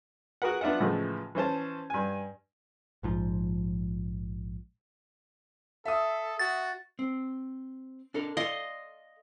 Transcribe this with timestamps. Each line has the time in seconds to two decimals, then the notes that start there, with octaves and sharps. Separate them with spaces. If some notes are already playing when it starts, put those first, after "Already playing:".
0.42 F#4 G#4 A#4 B4 F#5
0.61 B3 D4 F4 E5 F#5
0.80 A2 C#3 E3 F3 G#3 A3
1.35 E3 C#4 C5 A5
1.90 G2 G#5
3.03 A#1 G#2 F3
5.85 A4 E5 D#6
6.39 F#4 A6
6.99 C4
8.14 D4 A4 A#4
8.37 A4 D5 D#5 F5 C6